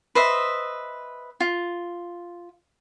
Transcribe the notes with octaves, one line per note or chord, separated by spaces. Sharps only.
B4 C5 D#5 E5
F4